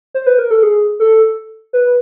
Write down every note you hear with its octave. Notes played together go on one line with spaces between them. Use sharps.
C5
B4
A#4
A4
G#4
A4
B4